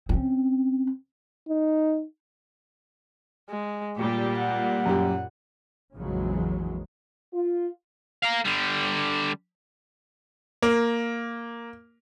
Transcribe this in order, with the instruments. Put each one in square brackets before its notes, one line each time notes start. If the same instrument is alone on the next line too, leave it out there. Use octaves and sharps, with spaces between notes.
[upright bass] C4 C#4
[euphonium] D#4
[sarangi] G#3
[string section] A#2 G3 [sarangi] G4
[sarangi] F#5
[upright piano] F#2 G4
[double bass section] A#1 F2 C#3 E3 F#3 G#3
[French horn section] F4
[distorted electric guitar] A#4 F5
D3 G3
[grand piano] A#3